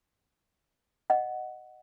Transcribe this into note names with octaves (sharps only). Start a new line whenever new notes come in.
D#5 F#5